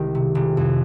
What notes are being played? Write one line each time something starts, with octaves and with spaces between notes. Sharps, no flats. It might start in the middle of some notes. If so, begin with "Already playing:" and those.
Already playing: C2 D#3 G#3
C3
F1
F2